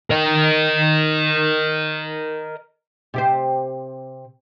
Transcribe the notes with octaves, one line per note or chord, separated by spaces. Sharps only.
A#4 D#5
C3 G4 C5